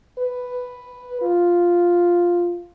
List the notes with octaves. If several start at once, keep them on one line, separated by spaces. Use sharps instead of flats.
B4
F4